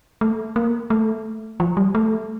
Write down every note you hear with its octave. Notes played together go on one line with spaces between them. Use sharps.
A3
A#3
A3
F3
G3
A3